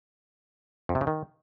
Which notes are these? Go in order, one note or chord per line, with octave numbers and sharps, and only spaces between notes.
F2
C3
C#3
D#3